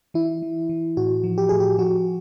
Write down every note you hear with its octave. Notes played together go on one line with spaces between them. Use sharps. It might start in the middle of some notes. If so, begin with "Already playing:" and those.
E3 E4
E3
E3
A2 F#4
F3
G4
A2 G#4
G4
F3 F#4